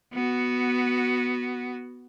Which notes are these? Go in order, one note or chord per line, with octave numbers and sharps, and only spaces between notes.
B3 F#4